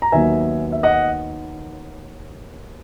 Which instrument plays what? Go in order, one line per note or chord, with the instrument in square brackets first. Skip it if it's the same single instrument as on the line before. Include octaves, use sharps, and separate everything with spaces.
[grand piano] A#5
D#2 D#3 F#3 B3 E5 G#5
E5
D#5 F#5